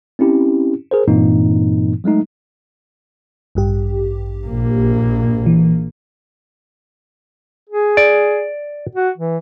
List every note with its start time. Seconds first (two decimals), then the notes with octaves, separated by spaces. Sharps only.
0.19 C4 C#4 E4 G4
0.91 G#4 A#4 C5
1.08 G2 A#2 E3 A#3 C4 D#4
2.04 F#3 G#3 A3 D#4
3.55 A1 G2 G4
4.47 A#1 A#3
5.46 E3
7.69 G#4
7.97 D5
8.95 F#4
9.17 E3